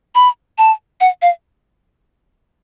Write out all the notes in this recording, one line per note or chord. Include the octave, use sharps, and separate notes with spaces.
B5
A5
F#5
F5